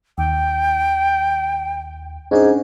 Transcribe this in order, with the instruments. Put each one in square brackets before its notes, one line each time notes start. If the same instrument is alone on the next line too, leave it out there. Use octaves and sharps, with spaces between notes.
[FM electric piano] D#2 [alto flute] G5
[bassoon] G#2 [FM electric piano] C#4 D4 G#4